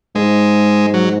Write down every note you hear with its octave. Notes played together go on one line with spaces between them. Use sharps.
G#2 G#3
F#3